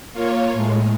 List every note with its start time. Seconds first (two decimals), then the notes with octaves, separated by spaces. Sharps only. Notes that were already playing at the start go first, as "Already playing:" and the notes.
0.13 A#3 F4 C#5
0.52 A2 G#3